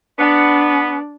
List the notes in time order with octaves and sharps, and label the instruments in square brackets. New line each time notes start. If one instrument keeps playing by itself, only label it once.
[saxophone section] B3 [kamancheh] D4